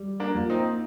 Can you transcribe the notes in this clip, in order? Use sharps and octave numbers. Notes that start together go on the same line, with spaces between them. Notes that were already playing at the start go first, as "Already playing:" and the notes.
Already playing: G3
A#3 D4
A#3 F4 A#4
C4 D#4